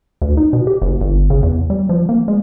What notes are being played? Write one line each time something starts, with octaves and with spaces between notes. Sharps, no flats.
D2
D#4
B2
G4
F#1
G1
C#3
E2
G3
F3
A#3
G#3